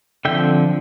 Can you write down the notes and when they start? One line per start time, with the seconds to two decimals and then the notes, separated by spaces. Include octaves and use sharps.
0.25 D3 F3 C4 E5 G5